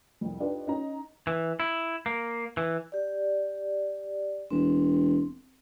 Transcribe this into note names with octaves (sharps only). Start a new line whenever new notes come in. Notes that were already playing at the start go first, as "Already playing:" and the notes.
C2 F2
D4 D#4 F4 G4 A4 B4
C#4 D#4 A#5
E3
E4
A#3
E3
G4 D5
E1 C4